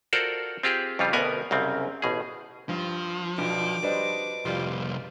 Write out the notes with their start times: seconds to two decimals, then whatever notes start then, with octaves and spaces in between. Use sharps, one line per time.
0.13 F4 F#4 A4 A#4 C5 D5
0.63 C4 F4 G4 G#4
0.99 F2 C#3 G3 F4
1.13 D2 B2 B3 A#4 G#5
1.51 C2 F#2 C#3 C4
2.02 A1 B2 G#4
2.69 G2 F3
3.38 B1 D4 F#4 D6
3.83 G3 D4 B4 C5 D#5
4.45 C2 F2 G3 F4